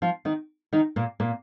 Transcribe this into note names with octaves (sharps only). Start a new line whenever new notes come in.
F3 F4
D#3 D#4
D#3 D#4
A#2 A#3
A#2 A#3